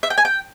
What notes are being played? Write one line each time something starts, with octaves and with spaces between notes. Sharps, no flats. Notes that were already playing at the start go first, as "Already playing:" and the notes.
E5
G5
G#5
G5